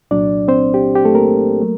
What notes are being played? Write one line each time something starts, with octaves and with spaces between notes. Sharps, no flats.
C2 A#2 F#3 D4 D5
C4 C5
G4
G4
A3 A4
A#3 A#4
F#3 A3